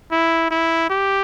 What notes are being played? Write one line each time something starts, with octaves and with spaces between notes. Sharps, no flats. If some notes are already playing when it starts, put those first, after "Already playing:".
E4
E4
G4